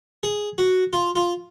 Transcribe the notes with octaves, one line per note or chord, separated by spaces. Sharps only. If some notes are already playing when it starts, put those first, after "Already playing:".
G#4
F#4
F4
F4